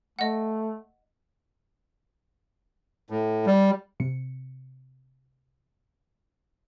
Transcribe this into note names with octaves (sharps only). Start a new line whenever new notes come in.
A3 D#5 F#5
A2
G3
C3 C#7